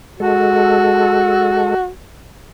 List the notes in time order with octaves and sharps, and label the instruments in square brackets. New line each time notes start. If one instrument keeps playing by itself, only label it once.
[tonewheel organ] G#3 A4 [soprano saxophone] F#4